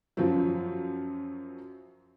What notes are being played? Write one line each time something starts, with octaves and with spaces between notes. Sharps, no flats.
F#2 F3 F#3